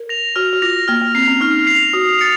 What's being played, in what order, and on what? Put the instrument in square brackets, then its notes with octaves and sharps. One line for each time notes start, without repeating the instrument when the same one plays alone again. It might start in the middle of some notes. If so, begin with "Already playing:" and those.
Already playing: [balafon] A#4
[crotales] A#6 F7
[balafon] F#4 [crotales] F6
[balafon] F#4
[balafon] F4 [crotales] A#6 F7
[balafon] A#3 [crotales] F6
[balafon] A#3
[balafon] C4 [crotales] C7 F7
[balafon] C#4
[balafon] D#4 [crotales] F6
[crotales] C7 F7
[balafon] F#4 [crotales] D#6
[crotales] A6 C#7 F7